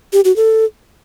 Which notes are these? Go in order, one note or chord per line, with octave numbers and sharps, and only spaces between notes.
G4
F#4
A4